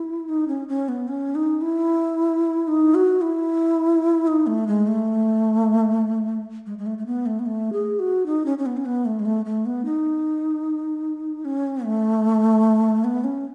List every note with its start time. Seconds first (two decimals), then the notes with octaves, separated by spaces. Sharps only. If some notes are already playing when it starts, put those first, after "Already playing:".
Already playing: E4
0.29 D#4
0.48 C#4
0.68 C#4
0.89 B3
1.08 C#4
1.35 D#4
1.61 E4
2.68 D#4
2.95 F#4
3.21 E4
4.27 D#4
4.47 A3
4.67 G#3
4.87 A3
6.66 G#3
6.78 G#3
6.86 A3
6.98 A3
7.06 B3
7.26 A3
7.39 B3
7.46 A3
7.73 G#4
7.99 F#4
8.26 D#4
8.46 C#4
8.58 C#4
8.66 B3
8.77 C#4
8.85 B3
9.05 A3
9.20 G#3
9.25 A3
9.45 A3
9.66 B3
9.85 D#4
11.45 C#4
11.84 A3
13.04 B3
13.24 C#4